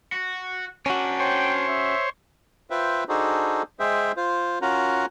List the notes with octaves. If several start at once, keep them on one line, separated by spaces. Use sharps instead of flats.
F#4
C#4 D4 F#4 A#4
C5 C#5 G5
E5
F4 B4 C5 E5 G5
D4 D#4 F#4 G#4 A4 C5
G#3 G#4 C5 E5 G5
F4 C5
C#4 F4 F#4 A#4 F#5 A#5